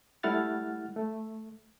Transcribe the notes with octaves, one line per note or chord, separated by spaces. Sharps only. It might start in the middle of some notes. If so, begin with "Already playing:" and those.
G3 A3 E4 F#5 F6 A6
A3